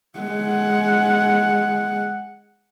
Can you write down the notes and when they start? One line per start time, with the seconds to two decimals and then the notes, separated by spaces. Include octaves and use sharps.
0.19 G#3 F#5